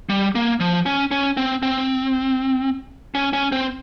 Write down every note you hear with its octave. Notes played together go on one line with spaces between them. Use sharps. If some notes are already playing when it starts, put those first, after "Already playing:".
G3
A#3
F3
C#4
C#4
C4
C4
C#4
C#4
C4